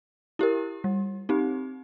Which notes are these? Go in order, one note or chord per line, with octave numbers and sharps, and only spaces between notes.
E4 G4 A#4
G3
C4 D#4 G4